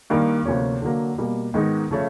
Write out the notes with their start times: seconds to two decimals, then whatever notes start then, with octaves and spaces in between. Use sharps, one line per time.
0.10 G2 D#3 G3 A#3 D#4
0.45 D2 C3 F3 A#3 C#4
0.82 D3 F#3 A#3
1.18 B2 G3 A#3
1.54 G#2 D#3 G#3 B3 D#4
1.91 C#3 F3 A3 C#4